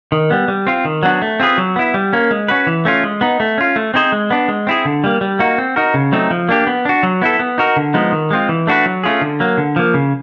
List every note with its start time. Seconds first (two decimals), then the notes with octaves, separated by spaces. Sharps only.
0.12 D#3
0.30 G3 B3
0.48 G3
0.67 C4 F4
0.85 D#3
1.03 F#3 B3 D4 F#4
1.22 A3
1.40 C4 F4 G#4 B4
1.58 F#3
1.76 B3 E4
1.94 G3
2.13 A#3 C#4
2.31 G#3
2.48 C#4 F#4 B4
2.67 E3
2.85 A3 C#4 F4
3.04 G#3
3.21 B3 D#4
3.40 A3
3.58 C#4 F4
3.76 A3
3.94 C4 D#4 G#4 C5
4.12 G#3
4.30 B3 D4
4.48 G#3
4.67 C4 E4 G#4
4.85 D3
5.04 G3 A#3
5.21 G3
5.39 A#3 D#4 F#4
5.58 C4
5.76 D#4 F#4 A#4
5.94 C#3
6.12 F#3 A3 C4 D#4
6.31 F3
6.49 A#3 D4 G4
6.67 B3
6.85 D4 F#4
7.03 F#3
7.22 B3 E4 A4
7.39 B3
7.58 D#4 F#4 A#4
7.76 D3
7.94 F3 G#3 B3 D#4
8.12 D#3
8.31 G#3 C4 F4
8.49 E3
8.67 A3 D4 F#4 B4
8.86 F#3
9.04 A3 C#4 F4 G#4
9.21 D3
9.40 F#3 A#3
9.58 D3
9.76 F3 A#3
9.94 C#3